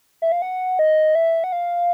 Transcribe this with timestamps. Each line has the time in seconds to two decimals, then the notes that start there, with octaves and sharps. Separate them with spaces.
0.22 E5
0.32 F5
0.42 F#5
0.79 D#5
1.15 E5
1.44 F#5
1.52 F5